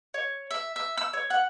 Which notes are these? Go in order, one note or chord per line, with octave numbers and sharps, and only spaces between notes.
C#5
E5
E5
E6
C#5
F#5